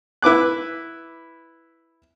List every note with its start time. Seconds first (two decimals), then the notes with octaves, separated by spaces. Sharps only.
0.22 E4 B4 D6 F#6